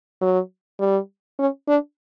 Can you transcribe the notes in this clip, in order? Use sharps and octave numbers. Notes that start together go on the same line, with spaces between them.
F#3
G3
C#4
D4